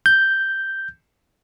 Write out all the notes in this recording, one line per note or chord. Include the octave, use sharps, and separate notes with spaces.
G6